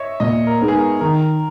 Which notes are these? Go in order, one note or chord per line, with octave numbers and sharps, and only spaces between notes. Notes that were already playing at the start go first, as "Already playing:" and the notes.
Already playing: C#5 D#5 E5
A#2 D#5
A#4
G#3 B3 D#4
G#4
A#4
D#3 A#4